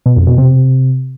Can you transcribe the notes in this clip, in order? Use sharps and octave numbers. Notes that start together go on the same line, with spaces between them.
B2
F2
B2
C3